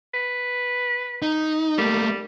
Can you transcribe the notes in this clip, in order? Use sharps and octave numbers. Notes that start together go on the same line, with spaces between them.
B4
D#4
G3 A3 A#3